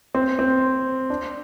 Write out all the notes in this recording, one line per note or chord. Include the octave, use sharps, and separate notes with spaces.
C4
C4
D4